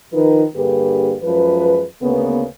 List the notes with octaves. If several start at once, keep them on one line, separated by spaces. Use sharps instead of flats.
D#3 F3 D#4 A#4 B4
G2 D3 A#3 G4 G#4 B4
F#2 F3 G#3 B4
D2 C#3 A#3 B3